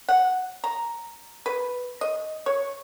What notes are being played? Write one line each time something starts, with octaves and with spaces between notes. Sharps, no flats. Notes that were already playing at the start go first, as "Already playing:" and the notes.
F#5
A#5
B4
D#5
C#5